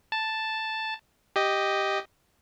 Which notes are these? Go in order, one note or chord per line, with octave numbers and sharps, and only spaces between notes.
A5
G4 D#5